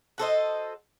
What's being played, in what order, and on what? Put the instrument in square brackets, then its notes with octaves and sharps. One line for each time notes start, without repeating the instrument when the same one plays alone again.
[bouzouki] F#4 A4 C5 D#5